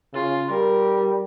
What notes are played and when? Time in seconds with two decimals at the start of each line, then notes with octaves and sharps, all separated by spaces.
0.13 C#3 F4
0.50 G3 A#4